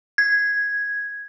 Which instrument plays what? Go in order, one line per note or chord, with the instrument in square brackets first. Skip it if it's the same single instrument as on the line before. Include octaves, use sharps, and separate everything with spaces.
[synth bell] G#6